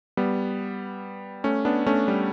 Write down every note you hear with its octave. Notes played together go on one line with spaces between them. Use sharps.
G3 B3
A3 C#4
B3 D4
A3 C#4
G3